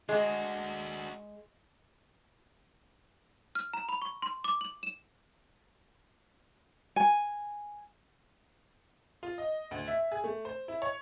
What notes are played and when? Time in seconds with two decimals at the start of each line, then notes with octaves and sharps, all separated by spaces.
0.09 G#3 D4 F#4
3.55 F6
3.73 A#5
3.89 B5
4.02 C#6
4.22 C6
4.44 D6
4.61 F#7
4.83 E7
6.96 G#5
9.23 F4
9.38 D#5
9.71 D2
9.88 E5
10.12 G#4
10.24 A3
10.45 C5
10.68 E4
10.82 C#5